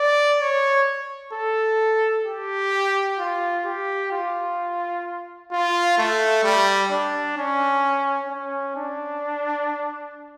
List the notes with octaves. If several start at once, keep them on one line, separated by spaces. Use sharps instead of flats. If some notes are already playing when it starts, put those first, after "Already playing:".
Already playing: D5
C#5
A4
G4
F4
G4
F4
F4
A3
G3
D4
C#4
C#4
D4